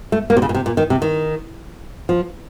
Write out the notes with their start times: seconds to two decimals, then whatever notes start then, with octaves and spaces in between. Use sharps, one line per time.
0.12 A3
0.30 A#3
0.37 C3
0.42 C#3
0.49 A#2
0.54 C3
0.66 A#2
0.77 D#3
0.90 C3
1.02 D#3
2.09 F3